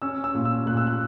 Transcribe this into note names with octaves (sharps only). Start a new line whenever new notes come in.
C#4 E6
E6
A#2
E6
A#2 F#6
E6
F#6